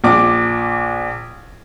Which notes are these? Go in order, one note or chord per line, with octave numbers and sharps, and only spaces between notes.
A#1 D6